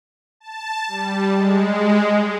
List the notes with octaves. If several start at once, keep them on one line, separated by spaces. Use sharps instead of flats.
A5
G3
G#3